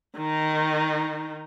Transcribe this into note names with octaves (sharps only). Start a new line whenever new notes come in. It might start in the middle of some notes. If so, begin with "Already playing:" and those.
D#3 D#4